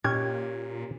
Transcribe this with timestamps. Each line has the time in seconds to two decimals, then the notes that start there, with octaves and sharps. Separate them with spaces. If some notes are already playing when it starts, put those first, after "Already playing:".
0.04 A#2 C#4 G4 G#6